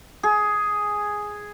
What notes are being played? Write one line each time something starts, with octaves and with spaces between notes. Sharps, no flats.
G#4